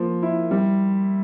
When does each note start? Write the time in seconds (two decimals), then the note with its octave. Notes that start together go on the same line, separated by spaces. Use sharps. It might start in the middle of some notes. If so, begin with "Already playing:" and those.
Already playing: F3 A#3
0.23 E4
0.51 G3